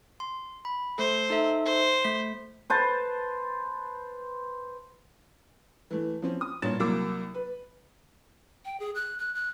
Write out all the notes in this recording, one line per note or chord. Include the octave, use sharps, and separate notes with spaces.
C6
B5
A3 A4 C5
D#4 A4 E5
C5
A3 B6
B4 C5 A5
E3 A3
F3 C4 C#4
D#6
G2 A#2 C#5 A6 E7
C2 F#3 A#3 A#4 D6 E6
B4
G5
G#4
F#6
F#6
F#6